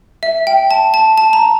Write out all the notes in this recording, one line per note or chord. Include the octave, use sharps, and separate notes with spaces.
E5
G5
A5
A5
A5
A#5